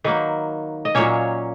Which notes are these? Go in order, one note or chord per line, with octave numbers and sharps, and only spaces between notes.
D#3 F#3 A#3 B4
D#5
A#2 F#3 A#3 C#4 C#5